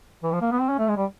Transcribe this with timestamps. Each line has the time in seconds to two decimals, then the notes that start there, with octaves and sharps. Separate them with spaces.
0.23 E3
0.32 F3
0.41 A#3
0.51 B3
0.60 C4
0.69 C#4
0.78 A3
0.88 G#3
0.97 G3